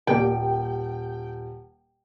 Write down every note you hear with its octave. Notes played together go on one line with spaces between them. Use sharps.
D#1 A#3 G4 A#4 G5